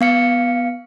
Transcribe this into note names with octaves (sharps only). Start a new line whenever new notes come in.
B3 F5 C#7